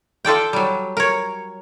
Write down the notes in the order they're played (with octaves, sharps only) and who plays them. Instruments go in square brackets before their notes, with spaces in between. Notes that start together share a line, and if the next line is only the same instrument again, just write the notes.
[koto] F4 A4 D5 G5
F#3 G3
A#4 C#5